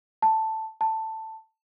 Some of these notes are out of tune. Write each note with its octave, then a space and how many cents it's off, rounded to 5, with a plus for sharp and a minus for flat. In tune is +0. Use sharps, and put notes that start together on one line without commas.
A5 +5
A5 +10